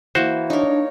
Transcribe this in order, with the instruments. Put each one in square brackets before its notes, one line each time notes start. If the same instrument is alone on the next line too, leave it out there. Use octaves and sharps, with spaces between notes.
[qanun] E3 A#3 [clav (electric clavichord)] F#4 C5
[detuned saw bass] D4 [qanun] D#4 A#4 [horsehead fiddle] C#5